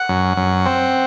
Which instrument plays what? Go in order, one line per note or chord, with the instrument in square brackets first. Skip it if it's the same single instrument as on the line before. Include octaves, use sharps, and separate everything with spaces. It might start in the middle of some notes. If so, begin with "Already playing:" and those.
Already playing: [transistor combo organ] F#5
F#2
F#2
C4